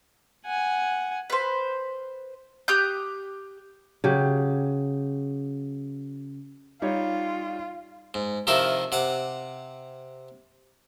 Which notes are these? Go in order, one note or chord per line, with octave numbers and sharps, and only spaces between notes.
F#5 G#5
B4 C5
G4 D#6 F#6 G6
C#3 F#3 G4
G3 D#4 F4 C#5
G#2
C3 D#3 F3 E4 A4 A#4
C3 F#5 D6